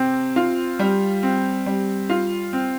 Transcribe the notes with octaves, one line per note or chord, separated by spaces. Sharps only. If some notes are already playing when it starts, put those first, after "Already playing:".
Already playing: C3 C4
F4
G3
C4
G3
F4
C4